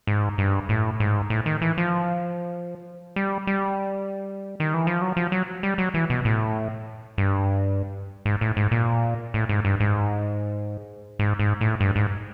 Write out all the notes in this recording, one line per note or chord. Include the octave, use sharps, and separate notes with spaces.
G#2
G2
A2
G#2
A2
D#3
E3
F3
G3
G3
D#3
E3
F3
F#3
F3
F#3
G3
F#3
E3
B2
A2
G2
G#2
A2
G#2
A#2
A2
G#2
G2
G#2
G#2
G#2
A2
G2
G#2